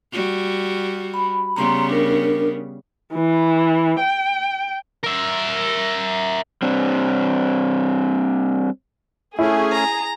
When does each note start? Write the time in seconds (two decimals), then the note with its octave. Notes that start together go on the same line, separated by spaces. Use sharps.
0.13 G3 F#4
1.14 B5
1.56 C#3 G3 B3 A#5 C6
1.90 D4 A#4
3.12 E3
3.99 G5
5.04 A#4 E5
6.62 G3 C4 D4
9.39 A3 C#4 E4 G#4
9.72 A#5